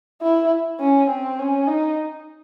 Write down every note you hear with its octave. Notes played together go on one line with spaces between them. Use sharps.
E4
C#4
C4
C#4
D#4